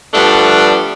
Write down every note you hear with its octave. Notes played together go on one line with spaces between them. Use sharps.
F3 G3 A3 B3 D4